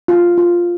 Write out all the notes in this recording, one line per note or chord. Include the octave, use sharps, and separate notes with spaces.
F4
F4